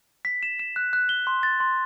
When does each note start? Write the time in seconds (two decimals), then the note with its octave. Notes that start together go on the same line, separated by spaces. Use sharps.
0.25 B6
0.43 E7
0.59 E7
0.76 F#6
0.93 F#6
1.09 G7
1.27 C6
1.43 A6
1.60 C6